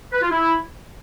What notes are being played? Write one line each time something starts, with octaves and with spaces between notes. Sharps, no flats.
B4
F4
E4